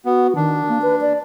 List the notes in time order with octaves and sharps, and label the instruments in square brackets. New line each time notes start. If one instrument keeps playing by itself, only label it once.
[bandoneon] B3 [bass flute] F#4
[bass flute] D#3 [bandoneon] D4
[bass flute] A#3
B4
D5